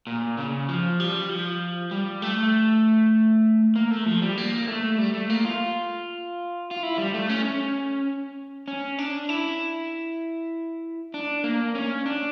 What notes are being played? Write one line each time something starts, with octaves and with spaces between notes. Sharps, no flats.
A#2
C#3
F3
G3
F3
G3
A3
A#3
A3
F3
G3
A#3
A3
G3
A3
A#3
F4
F4
E4
G3
A3
C#4
C#4
C#4
D4
E4
D4
A#3
C#4
D4